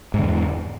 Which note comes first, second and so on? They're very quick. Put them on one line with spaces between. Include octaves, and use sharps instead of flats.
G#2 D3 E2